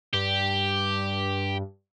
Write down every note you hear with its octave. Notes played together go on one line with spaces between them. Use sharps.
G2 G4